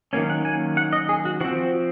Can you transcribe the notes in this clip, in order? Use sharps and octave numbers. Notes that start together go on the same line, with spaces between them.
D#3 F#3 A#3 C#4 G#5
F#5
G#5
F#5
D#5
G#4
F#4
F3 C4 F#4